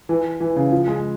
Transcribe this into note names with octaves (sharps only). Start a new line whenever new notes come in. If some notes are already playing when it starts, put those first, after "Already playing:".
E3
E3
C#3
F3
G#3